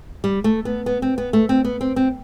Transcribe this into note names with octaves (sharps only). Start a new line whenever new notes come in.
G3
A3
B3
B3
C4
B3
A3
C4
B3
C4
C4